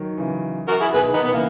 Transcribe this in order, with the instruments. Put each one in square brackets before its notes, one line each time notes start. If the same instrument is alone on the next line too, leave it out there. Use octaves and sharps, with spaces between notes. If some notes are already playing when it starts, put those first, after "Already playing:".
Already playing: [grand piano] D#3 F#3
C#3 E3
[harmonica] F#4 A#4
E4 G#4
[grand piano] B2 D#3 [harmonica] G#4 B4
[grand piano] B2 D#3 [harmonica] B3 D#4
[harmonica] B3
[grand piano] C#3 E3 [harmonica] A#3